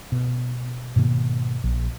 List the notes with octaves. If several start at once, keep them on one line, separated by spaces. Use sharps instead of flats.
B2
G#2 B2 D#3 A#3
A#1